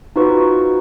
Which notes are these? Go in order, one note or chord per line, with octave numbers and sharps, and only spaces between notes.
D#4 F4 F#4 B4 C5 C#6